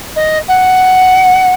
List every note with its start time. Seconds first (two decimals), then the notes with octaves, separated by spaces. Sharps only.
0.16 D#5
0.48 F#5